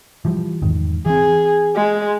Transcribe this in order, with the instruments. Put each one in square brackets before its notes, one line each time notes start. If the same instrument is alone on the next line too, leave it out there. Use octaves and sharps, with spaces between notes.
[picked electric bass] E3 F3 G3
E2 G#2 D#3
[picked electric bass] E3 C4 [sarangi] G#4
[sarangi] G#3